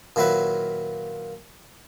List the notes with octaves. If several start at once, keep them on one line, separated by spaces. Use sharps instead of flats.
A#2 D#3 F#3 E4 F#4 B4